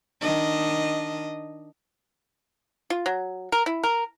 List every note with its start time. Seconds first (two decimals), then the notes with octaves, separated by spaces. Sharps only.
0.21 D#3 D4 D#5
2.90 F4
3.06 F#3
3.52 A#4
3.66 E4
3.84 A#4